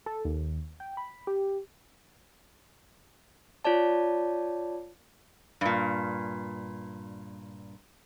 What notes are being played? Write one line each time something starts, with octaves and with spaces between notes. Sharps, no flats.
A4
D#2
G5
B5
G4
F4 C#5 D5 A5
G2 A#2